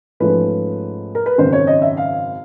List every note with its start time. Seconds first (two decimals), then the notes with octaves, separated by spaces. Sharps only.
0.20 G#2 F3 A3 C#4 B4
1.15 A#4
1.26 B4
1.38 G#1 F#2 C#3 C5
1.53 C#5
1.67 D#5
1.82 E5
1.97 F5